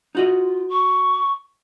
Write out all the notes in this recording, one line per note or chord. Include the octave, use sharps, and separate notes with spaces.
D#4 F4 F#4 D#5
C#6